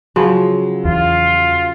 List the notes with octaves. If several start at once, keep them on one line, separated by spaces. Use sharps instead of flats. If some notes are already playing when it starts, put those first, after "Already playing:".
C#3 F3 F#3
E2 F4